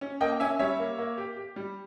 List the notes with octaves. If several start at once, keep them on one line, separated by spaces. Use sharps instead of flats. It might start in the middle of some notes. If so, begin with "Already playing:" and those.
C#4
A#3 D#5 G5
C#4 E5 G#5
G3 C#5 E5
A#3
A#3
G4
G4
G3